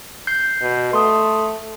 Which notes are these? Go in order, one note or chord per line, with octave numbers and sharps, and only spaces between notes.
G6 C7
B2
A3 C6 D#6